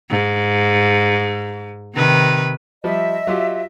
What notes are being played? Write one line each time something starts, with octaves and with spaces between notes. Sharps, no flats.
G#2
C3 D#3 B4
F3 G3 D#5 E5
F#3 F4 G4